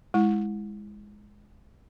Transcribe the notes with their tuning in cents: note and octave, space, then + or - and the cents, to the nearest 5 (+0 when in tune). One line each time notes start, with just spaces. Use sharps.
G#3 +0 E4 +0